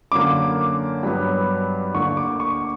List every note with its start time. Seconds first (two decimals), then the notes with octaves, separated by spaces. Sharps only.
0.12 F#2 D3 A#3 D6
1.03 G2 F#3 B3
1.93 D2 D3 A#3 C#6
2.17 D6
2.40 C#6